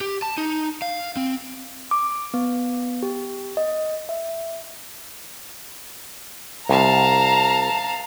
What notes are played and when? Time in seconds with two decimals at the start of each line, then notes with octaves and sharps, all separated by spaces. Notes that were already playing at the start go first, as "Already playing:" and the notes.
0.01 G4
0.22 A5
0.38 D#4
0.82 F5
1.17 C4
1.91 D6
2.34 B3
3.03 G4
3.57 D#5
4.09 E5
6.69 C2 F5 A5 A#5